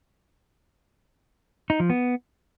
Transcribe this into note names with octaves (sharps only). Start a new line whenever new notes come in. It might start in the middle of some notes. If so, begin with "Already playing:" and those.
D#4
F3
B3